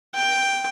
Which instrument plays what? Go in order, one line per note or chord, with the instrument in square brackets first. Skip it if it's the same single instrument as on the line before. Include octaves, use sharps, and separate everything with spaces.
[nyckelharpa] G5